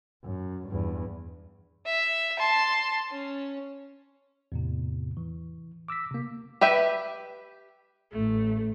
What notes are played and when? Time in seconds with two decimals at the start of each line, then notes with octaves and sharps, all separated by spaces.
0.24 F#2
0.68 E2 G2
1.86 E5
2.39 A5 C6
3.11 C#4
4.52 E2 A2 C3
5.17 E3
5.88 D6 E6 A#6 B6
6.11 C3 A#3
6.61 G4 B4 E5 G5
8.12 A1 A3